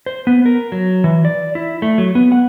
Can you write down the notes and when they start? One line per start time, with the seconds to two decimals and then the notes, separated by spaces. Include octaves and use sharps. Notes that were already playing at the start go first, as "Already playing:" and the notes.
0.06 C5
0.27 B3
0.46 A#4
0.72 F#3
1.04 E3
1.25 D5
1.55 E4
1.82 A3
1.98 F#3
2.15 B3
2.32 F#5